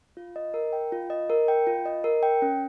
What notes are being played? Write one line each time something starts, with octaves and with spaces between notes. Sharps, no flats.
F4
D#5
A#4
G5
F4
D#5
A#4
G5
F4
D#5
A#4
G5
C#4